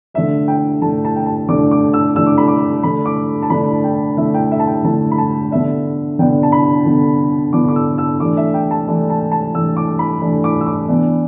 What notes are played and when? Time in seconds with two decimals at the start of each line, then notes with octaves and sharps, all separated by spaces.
0.14 D3 A3 D4 E5
0.48 G5
0.82 D3 A3 D4 A5
1.05 A5
1.16 G5
1.26 A5
1.49 D3 A3 D4 D6
1.71 D6
1.94 E6
2.16 D3 A3 D4 E6
2.26 D6
2.38 B5
2.48 D6
2.83 D3 A3 D4 B5
3.06 D6
3.43 A5
3.50 D3 A3 D4 B5
3.84 G5
4.17 D3 A3 D4 E5
4.34 G5
4.52 E5
4.59 A5
4.67 G5
4.84 D3 A3 D4 A5
5.11 B5
5.18 A5
5.51 D3 B3 D4 E5
6.19 D3 B3 D4 G5
6.43 A5
6.52 B5
6.86 D3 B3 D4
7.53 D3 B3 D4 D6
7.68 D6
7.76 E6
7.98 E6
8.20 E3 A3 D4 D6
8.37 E5
8.54 G5
8.71 A5
8.88 E3 A3 D4
9.10 A5
9.32 A5
9.54 E3 A3 D4 E6
9.77 D6
9.99 B5
10.22 E3 A3 D4
10.44 D6
10.61 E6
10.66 D6
10.88 E3 B3 D4